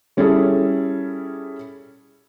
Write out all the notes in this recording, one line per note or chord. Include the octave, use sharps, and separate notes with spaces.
G3 C#4 E4 G#4 A4